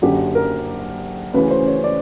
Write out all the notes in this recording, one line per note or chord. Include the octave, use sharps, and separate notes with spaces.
F#1 F#2 D3 G4
A#4
D2 C#3 E3 B4
C5
C#5
D5